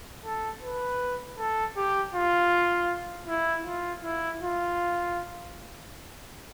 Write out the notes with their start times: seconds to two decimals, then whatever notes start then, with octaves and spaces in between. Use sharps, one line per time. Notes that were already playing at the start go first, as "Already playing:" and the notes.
0.25 A4
0.63 B4
1.39 A4
1.77 G4
2.15 F4
3.28 E4
3.66 F4
4.03 E4
4.42 F4